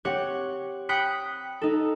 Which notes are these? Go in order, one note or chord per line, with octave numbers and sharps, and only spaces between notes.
C4 G4 C#5 F#5
G5 B5 D#6 F#6 B6 C#7
D#4 A4